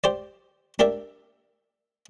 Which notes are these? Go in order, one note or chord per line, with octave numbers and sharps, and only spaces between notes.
G4 C5 D5
D4 G4 A#4 D5 E5